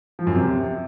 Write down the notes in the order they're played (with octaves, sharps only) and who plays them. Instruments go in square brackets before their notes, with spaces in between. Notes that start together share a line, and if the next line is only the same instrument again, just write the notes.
[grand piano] F3
F#2
C3